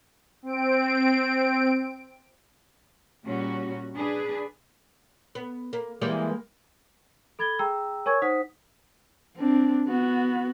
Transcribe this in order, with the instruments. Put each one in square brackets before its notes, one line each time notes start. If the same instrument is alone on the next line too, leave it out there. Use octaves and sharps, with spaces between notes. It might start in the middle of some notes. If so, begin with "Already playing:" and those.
[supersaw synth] C4 D7
[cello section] A#2 G3 C#4 F#4
D4 G#4 B4
[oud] B3
A#3
[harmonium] E3 [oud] G3 G#3 A#3
[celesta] A4 B5 G#6 A6 G7
G#4 G5 A#5 E6
A#4 C#5 G#5 C#6 E6 G#6
D#4 C5 F#5 D#6 B6
[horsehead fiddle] C4 D4
B3 F#4